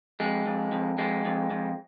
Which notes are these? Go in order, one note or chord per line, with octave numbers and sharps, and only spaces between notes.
F2 G#3
F2
F2
F2 G#3
F2
F2